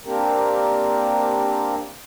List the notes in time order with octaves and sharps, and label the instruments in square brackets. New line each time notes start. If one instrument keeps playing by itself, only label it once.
[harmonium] A#3 C4 D4 G4 A#4